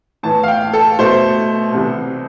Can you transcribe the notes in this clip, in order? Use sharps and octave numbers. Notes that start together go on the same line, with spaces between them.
A2 E3 B3 A5
F5
G5
A4
B2 A3 C5
C2 C3 E3